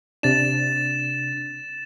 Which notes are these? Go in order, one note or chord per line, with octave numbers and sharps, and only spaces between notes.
C3 D4 A6 E7